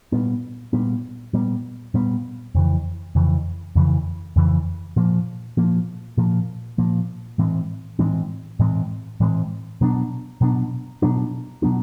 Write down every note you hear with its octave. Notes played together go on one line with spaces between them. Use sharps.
A#2 G3 B3
A#2 G3 B3
A#2 G3 B3
A#2 G3 B3
F2 C#3 E3
F2 C#3 E3
F2 C#3 E3
F2 C#3 E3
A#2 F3 A#3
A#2 F3 A#3
A#2 F3 A#3
A#2 F3 A#3
A2 E3 G#3 C4
A2 E3 G#3 C4
A2 E3 G#3 C4
A2 E3 G#3 C4
B2 F#3 B3 D4
B2 F#3 B3 D4
B2 F#3 B3 D4
B2 F#3 B3 D4